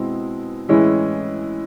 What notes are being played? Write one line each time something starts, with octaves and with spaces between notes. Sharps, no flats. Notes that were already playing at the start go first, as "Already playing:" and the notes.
Already playing: B2 G#3 C4 E4
A2 E3 G#3 C#4 E4